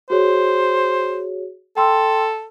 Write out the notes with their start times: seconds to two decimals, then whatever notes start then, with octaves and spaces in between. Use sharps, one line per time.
0.10 F#4 G#4 C5 C#5
1.77 A4 G5 C6 E6